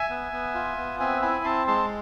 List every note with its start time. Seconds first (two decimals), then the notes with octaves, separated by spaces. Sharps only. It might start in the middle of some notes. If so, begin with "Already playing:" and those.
Already playing: E5 G#5
0.10 B3
0.32 B3
0.55 F4
0.78 B3
1.00 C4 E5 G#5
1.22 E4 G#5 B5
1.45 C4 A5 C6
1.67 G#3 A5 C6